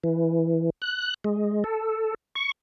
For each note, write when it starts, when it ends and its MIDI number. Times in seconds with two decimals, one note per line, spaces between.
0.04 0.70 52
0.82 1.14 90
1.24 1.64 56
1.64 2.14 69
2.35 2.52 85